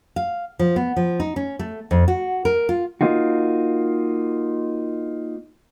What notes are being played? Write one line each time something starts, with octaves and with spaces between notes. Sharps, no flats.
F5
F3
B3
F3
D#4
C#4
A3
F2
F#4
A#4
F4
A#3 D#4 F4 F#4